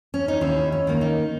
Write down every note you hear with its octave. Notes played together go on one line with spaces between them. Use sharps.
C#4
D#4
D#2 C#4 E4
C#4
D#3 A#3
D#4